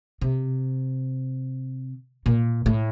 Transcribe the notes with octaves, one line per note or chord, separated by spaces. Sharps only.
C3
A#2
A2